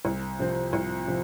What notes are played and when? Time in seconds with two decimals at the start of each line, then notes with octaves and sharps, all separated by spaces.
0.05 C2
0.39 C3 F3 C4
0.73 C2
1.07 C3 F3